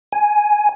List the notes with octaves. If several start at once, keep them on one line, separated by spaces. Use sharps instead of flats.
G#5